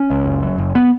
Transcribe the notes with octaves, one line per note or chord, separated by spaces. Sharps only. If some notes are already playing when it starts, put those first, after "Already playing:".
Already playing: C#4
C#2
F#1
F#2
F#1
B3